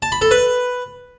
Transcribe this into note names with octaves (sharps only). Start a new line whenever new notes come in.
A5
B5
A4
B4